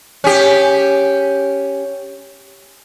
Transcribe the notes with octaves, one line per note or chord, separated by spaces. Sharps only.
C#4 G4